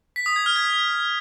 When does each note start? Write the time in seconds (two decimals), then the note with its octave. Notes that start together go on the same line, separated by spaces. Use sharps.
0.16 B6
0.26 D#6
0.36 G#6
0.46 F6
0.56 G#6